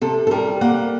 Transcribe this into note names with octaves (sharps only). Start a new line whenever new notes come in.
C3 A4
A4
G3 A#4
A#3 F#5